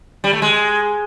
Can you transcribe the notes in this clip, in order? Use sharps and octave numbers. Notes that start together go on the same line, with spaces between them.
G3
A3
G#3